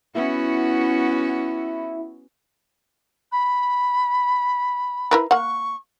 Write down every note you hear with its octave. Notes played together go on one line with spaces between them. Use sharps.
B3 C#4 E4 F#4
B5
E4 A#4 B4
A#3 F#5 C#6